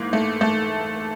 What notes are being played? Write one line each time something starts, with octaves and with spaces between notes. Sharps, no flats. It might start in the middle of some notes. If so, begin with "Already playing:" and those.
Already playing: G#2 E3 A#3
A3
A3